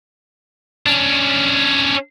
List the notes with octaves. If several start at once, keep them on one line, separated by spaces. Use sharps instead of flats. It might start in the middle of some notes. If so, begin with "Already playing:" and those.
C#4 D4